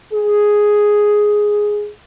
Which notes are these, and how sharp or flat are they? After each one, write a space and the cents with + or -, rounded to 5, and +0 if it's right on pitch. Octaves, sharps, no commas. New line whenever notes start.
G#4 +0